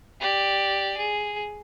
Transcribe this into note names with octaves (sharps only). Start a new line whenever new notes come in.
G4 D5
G#4